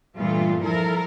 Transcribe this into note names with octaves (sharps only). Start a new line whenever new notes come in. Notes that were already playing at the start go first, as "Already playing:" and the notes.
G2 A#2 E3 A3 F4
F3 E4 A4 A#4